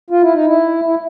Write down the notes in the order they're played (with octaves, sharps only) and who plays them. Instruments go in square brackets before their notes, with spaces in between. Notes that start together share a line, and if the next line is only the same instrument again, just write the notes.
[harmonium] F4
E4
D#4
E4
E4